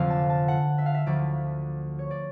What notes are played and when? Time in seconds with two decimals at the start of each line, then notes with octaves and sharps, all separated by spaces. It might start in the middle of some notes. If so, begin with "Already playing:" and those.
Already playing: F1 F2 D3 F3 F5
0.10 A5
0.30 A5
0.48 F#5
0.78 E5
0.86 F5
0.94 E5
1.06 D2 D3 F3 D5
1.99 C#5
2.11 D5